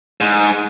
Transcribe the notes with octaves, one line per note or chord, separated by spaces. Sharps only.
G#2